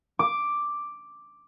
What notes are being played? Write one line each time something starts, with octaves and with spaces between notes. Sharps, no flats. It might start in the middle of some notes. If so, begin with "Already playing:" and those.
D6